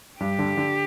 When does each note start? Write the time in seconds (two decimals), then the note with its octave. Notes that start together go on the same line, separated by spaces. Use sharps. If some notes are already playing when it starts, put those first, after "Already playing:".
0.20 G2 G4
0.39 D3
0.57 D3